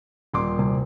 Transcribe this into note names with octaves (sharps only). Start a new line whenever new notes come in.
D#1 C6 D6
C2